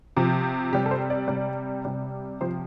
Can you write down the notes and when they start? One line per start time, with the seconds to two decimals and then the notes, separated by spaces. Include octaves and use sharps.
0.17 C3 F3
0.72 C3 G3 G4
0.86 A4
0.91 C5
1.10 D5
1.28 C3 G3
1.85 C3 G3
2.41 C3 F3 C5